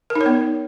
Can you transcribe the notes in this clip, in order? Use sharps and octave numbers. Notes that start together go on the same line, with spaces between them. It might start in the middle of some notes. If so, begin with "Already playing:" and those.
A#4
D#4
C#5
B3